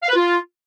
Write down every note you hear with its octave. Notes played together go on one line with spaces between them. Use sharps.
F5
B4
F4